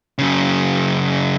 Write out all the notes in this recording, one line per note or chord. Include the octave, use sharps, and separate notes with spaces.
F#2 C#3